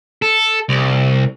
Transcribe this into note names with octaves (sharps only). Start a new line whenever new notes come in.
A4
C2